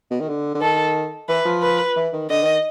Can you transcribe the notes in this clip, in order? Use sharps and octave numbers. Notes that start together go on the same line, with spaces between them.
B2
D#3
D3
D3
D#3 A4
E3 B4
F3
B4
E3
D#3
D3 D#5
D#3